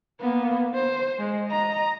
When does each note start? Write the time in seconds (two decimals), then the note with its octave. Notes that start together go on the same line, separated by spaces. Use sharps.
0.20 A#3 B3
0.75 C5
1.19 G#3
1.47 D#5 A#5